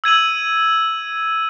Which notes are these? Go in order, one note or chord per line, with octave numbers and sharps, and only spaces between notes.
E6 G#6 D#7 F#7